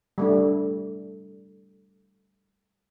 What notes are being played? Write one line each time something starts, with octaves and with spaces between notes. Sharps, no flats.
G3 A3 D4